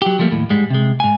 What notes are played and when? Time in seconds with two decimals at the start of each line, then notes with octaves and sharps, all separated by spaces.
0.02 F#3 G4
0.19 F3 G3 A3 A#3
0.32 D#2 A2
0.50 G#2 G3 G#3
0.70 C3 G#3
1.00 G#2 G#5